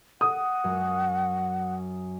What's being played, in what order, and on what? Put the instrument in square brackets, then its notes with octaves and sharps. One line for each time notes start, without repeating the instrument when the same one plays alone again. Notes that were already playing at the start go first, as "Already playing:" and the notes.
[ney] F#5 [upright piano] D#6
[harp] F#2